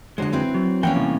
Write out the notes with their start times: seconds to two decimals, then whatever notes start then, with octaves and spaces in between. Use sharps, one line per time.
0.18 D3 F#3 G#3 C5 D#5
0.33 C4 E4 B4
0.54 F#3
0.83 E3 A#3 C#4 A#4 F#5 G5
0.96 A2 C3 G3